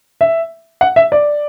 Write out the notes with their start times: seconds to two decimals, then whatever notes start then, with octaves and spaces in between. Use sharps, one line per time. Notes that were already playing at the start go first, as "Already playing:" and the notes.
0.21 E5
0.81 F#5
0.96 E5
1.12 D5